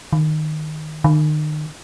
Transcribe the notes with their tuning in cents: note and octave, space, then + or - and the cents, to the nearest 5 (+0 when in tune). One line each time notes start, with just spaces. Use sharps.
D#3 -10
D#3 -35